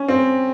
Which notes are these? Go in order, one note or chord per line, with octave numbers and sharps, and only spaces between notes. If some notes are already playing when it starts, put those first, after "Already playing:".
Already playing: C#4
C4